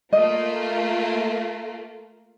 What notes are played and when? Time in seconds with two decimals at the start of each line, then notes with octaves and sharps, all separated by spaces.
0.13 A3 A#3 F4 D#5